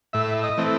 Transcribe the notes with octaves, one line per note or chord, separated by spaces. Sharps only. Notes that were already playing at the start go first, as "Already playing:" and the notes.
A2 E5
D#5
E3 A3 C4